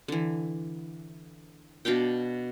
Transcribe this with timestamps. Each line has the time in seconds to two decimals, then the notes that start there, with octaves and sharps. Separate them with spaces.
0.08 D3 E3
1.85 B2 D4 F5 G5